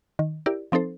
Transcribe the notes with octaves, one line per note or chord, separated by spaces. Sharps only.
D#3
E4 G4 A#4 D5
F3 C4 D#4 A4 C5